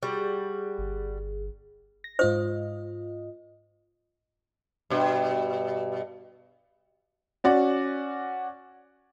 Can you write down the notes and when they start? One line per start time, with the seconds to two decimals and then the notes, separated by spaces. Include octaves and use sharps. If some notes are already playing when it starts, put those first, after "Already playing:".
0.03 G3 F#4 G#4
0.78 G1
2.04 A#6
2.19 G#2 F4 C5 D#5
4.90 G2 B2
7.44 C#4 F#4 D5